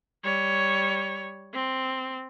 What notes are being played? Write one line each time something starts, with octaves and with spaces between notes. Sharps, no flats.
G3 C#5
C4